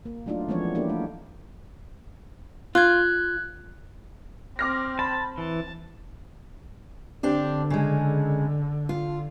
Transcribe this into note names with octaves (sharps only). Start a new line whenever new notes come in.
A#3
F#3 A3 D4 D#4 F4
E3 F3 G#3 B3 C#4 C#5
A#3 B3 D4 E4 G4
A3 D#4
F4 F#6 G#6
C4 D6 F6 A#6
A5 B5
E3 A5
D3 C4 D4 G4
C#3 G#3
F4